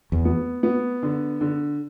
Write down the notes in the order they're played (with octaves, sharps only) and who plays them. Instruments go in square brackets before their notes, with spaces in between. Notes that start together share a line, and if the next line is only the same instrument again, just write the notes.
[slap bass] E2
[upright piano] B3
B3
D3
D3